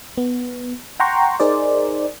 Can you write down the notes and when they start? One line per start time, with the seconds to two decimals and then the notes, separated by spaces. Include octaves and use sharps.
0.18 B3
1.00 F#5 G5 A#5 C6 C#6
1.40 D#4 G#4 A#4 C5 D5